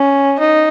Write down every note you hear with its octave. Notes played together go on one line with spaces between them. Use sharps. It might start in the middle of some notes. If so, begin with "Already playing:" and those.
Already playing: C#4
D#4